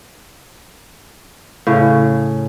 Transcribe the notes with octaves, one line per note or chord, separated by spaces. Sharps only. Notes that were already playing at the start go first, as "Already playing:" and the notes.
A2 C#3